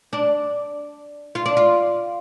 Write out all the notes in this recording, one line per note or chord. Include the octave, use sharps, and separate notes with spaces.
D4
F4
D4
F4